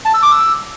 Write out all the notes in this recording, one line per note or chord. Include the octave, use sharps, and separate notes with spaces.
A5
E6
D6
E6